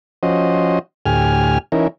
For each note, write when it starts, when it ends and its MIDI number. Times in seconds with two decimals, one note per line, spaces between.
0.23 0.79 53
0.23 0.79 61
0.23 0.79 66
0.23 0.79 72
0.23 0.79 75
1.06 1.58 38
1.06 1.58 45
1.06 1.58 67
1.06 1.58 80
1.06 1.58 89
1.72 1.88 52
1.72 1.88 61
1.72 1.88 63
1.72 1.88 64
1.72 1.88 70